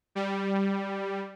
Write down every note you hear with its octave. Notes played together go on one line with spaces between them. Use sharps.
G3